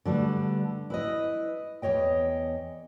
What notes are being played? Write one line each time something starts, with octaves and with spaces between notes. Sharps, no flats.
D3 G3 A3 B4
E4 B4 D#5
E2 G#2 C#5 D#5 G5